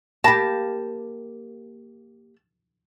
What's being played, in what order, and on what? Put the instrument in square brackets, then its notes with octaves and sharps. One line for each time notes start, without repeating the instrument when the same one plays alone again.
[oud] A#3 G4 [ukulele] A5 [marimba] B5 A#6